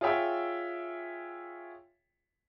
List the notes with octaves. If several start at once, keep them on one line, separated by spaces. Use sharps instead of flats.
F4 G#4 C#5 E5 G5